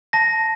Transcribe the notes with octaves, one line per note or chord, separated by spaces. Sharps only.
A5 A#6